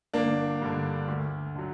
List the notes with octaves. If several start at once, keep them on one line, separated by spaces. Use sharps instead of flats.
G1 A#3 D4
G2 D3
D2
D3 F#3